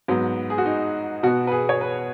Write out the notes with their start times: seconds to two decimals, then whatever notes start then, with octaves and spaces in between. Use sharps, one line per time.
0.08 G#2 F#3 B3
0.50 G#4
0.58 F#4
0.66 D#4
1.23 B2 B3 F#4
1.47 B4
1.52 G#4
1.69 C#5
1.81 B4